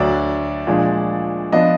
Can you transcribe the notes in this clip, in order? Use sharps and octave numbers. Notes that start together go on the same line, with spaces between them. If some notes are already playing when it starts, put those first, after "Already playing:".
Already playing: D2 D3 F#3 D4 D5
A#2 F3 G#3 D4
F3 B3 D4 D#5